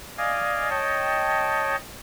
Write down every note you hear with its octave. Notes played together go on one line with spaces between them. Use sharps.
D5 D#5 F5 G#5
C#5 D#5 G5 A5